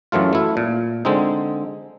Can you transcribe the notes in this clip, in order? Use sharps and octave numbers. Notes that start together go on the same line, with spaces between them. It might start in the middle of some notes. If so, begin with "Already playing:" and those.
F#2 E3 F#3 A3 F4
A3 E4
A#2
D3 G#3 C4 D#4